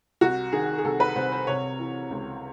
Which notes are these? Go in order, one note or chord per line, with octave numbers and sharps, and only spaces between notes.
C2 F#4
D#3 G#4
G#4
C2 A4
B4
C2 C5
C5
C3 C#5
E3
C#2